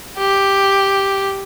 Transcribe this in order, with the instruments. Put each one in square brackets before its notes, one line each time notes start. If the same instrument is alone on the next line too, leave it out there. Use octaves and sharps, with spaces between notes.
[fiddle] G4